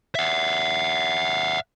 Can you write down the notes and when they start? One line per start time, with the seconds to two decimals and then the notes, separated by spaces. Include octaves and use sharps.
0.15 E5 F#5